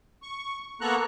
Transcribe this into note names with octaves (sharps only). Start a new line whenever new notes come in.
C#6
A#3 B3 A4 A#5 C#6 F#6